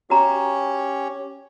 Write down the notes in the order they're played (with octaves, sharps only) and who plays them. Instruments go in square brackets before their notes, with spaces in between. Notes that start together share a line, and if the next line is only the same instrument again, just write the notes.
[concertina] C#4 G4 C#5 [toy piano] F#4 A#5